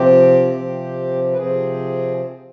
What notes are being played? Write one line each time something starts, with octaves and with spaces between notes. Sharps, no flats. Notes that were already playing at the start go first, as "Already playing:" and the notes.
Already playing: C3 F3 C4 G4
C3 F3 C4
B4
C3 F3 C4 G#4